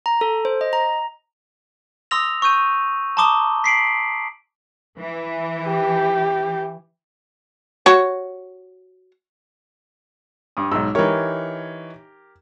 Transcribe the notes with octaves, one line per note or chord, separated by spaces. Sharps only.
A#5
A4
C5
D#5
A#5
C6 D#6 E6 A#6 F7
C#6 E6 G6 D#7
A5 A#5 C6 D6 D#6 G7
B6 C7 D7 F#7
E3
G4
F#4 C#5
G2 D6 D#6
B1 G#2 E6
E3 D#4 G4 A#4 C#5